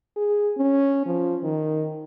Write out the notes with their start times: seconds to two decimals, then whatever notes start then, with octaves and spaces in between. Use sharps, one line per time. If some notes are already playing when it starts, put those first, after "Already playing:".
0.17 G#4
0.57 C#4
1.06 F3
1.43 D#3